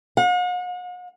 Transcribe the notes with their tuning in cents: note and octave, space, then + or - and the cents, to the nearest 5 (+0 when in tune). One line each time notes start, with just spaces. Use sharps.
F#5 -45